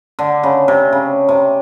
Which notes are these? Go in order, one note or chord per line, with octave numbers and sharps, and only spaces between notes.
D3
C#3
C3
C#3
C3